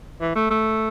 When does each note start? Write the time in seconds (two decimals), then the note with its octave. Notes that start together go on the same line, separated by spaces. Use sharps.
0.21 E3
0.36 A3
0.50 A3